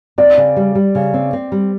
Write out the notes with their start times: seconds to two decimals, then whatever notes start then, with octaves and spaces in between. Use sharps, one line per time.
0.18 C4 D5
0.37 C#3
0.56 G3
0.75 G3
0.95 C#3
1.14 C4
1.33 C4
1.52 G3